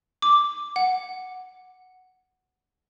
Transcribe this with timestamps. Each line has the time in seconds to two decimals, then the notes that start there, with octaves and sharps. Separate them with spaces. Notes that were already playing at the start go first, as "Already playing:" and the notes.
0.22 D6
0.76 F#5